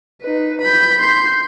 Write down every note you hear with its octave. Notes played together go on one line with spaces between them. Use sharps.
D#4 B4
B5 G6
C6 G6